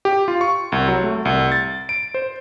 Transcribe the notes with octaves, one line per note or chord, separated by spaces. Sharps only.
G4
F4
C#6
C2
F#3
A3
C2
A6
D7
C5